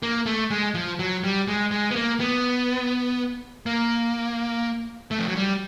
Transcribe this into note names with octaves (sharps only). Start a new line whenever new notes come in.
A#3
A3
G#3
F3
F#3
G3
G#3
G#3
B3
A#3
B3
A#3
A3
F3
F#3
G3